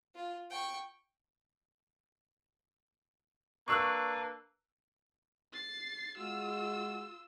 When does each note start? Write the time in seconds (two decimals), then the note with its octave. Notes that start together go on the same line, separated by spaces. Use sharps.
0.15 F4
0.50 G5 C#6
3.68 A#3 D4 B4 C#6 E6 F#6
5.53 A6 C7
6.18 G#3 F4 F#4 E6